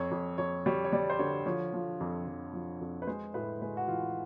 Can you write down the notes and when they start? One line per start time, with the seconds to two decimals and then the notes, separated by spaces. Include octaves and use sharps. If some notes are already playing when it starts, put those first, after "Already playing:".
Already playing: F2 C#5
0.11 F2
0.38 F2 C#5
0.66 G3 C#5
0.85 C#5
0.93 G3 D5
1.10 C5
1.19 D3 C#5
1.46 F3 C#5
1.74 F3
2.00 F2
2.27 F2
2.53 F3
2.81 F2
3.02 B4
3.07 G#3 C5
3.34 A2 B4
3.62 G#3 B4
3.77 F#4
3.88 E3 F4